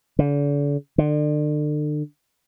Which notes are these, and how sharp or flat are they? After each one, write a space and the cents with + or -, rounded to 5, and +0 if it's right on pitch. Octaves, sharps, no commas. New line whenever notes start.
D3 -40
D3 +35